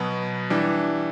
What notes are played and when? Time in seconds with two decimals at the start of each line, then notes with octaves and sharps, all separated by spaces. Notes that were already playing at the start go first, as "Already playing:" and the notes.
Already playing: B2 F#3 B3
0.50 E3 G3 D4